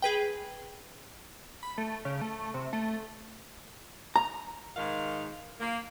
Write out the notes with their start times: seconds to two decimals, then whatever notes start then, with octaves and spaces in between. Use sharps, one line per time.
0.02 G#4 B4 G5
1.63 B5
1.78 A3
2.05 C#3
2.21 A3
2.54 C3
2.73 A3
4.16 A#5
4.77 G#2 D#3 F5
5.60 A#3